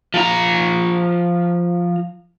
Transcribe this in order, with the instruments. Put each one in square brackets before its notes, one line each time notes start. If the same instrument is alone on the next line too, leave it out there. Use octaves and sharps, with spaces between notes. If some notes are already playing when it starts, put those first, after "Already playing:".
[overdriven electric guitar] F3 A#5